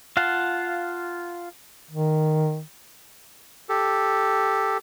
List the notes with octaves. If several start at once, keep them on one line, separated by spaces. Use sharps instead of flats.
F4 F5 F#5 A5
D#3
G4 A4